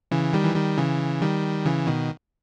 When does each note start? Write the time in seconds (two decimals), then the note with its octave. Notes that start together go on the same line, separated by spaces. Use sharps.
0.11 C#3 E3
0.33 D#3 G3
0.44 E3
0.56 D#3 G3
0.78 C#3 E3
1.21 D#3 G3
1.65 C#3 E3
1.87 B2 D#3